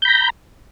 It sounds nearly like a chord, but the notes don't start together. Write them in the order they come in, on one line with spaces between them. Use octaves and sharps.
G6 B5 A#5